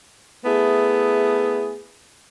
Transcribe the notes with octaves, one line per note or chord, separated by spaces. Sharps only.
A3 B3 E4 G#4